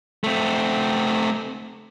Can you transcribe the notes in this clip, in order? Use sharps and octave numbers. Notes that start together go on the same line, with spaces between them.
A3 C4